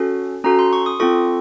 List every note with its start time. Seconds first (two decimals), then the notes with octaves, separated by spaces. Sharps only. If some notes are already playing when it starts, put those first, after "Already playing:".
Already playing: C#4 F#4 A4
0.44 C#4 F#4 A4 A#5
0.59 C6
0.73 C#6
0.86 D#6
1.00 C4 F4 A4 C#6